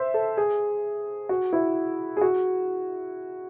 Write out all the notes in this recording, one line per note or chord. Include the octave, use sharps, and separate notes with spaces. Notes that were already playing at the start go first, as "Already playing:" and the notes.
Already playing: C5 E5
A4
G#4
F#4
E4
G#4
F#4